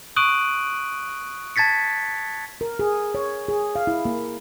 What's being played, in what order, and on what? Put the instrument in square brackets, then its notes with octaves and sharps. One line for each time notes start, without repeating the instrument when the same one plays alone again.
[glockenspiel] C#6 D#6 F#6 D7 D#7 F#7
A5 G#6 A6 B6 C#7
[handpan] A#4
G#4
C#5
G#4
F5
E4
A#3